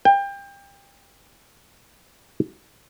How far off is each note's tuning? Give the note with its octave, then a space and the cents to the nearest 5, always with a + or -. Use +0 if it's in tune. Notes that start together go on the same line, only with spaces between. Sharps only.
G5 +25